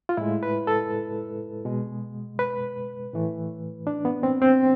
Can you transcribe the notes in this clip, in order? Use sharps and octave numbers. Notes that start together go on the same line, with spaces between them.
F4
A2 G#3 E4
B4
A4
B2 G#3
B4
A2 E3 A3
D4
B3
C4
C4